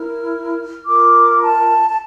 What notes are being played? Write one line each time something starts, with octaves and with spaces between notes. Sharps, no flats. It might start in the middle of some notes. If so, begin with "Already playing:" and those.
Already playing: E4 A#4 F6
F4 A#4 D6
A5
A5